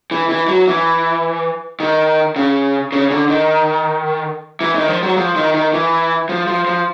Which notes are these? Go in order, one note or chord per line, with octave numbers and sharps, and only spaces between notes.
E3
E3
F#3
E3
D#3
C#3
C#3
D3
D#3
E3
D#3
F3
F#3
F3
D#3
D#3
E3
F3
F3
F3